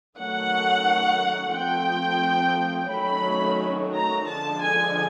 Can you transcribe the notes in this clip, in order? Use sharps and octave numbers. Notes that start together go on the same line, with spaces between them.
D#3 F#3 A3 C#4 F#5
F3 A3 C4 G5
D#3 F#3 A3 C#4 B5
A#5
D3 F3 G#3 A5
G#5